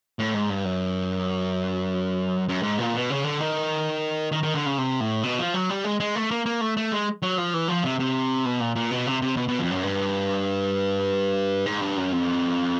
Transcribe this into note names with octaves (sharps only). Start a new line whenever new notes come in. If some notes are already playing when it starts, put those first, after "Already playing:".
A2
G#2
G2
F#2
F#2
G#2
A#2
B2
C#3
D3
D#3
D#3
D#3
D3
C#3
C3
A2
B2
F3
F#3
G3
G#3
G#3
A3
A#3
A#3
A3
A3
G#3
F#3
F3
E3
F3
C3
C3
B2
A#2
A#2
B2
C3
C3
B2
B2
F2
F#2
G2
G#2
G2
F#2
F2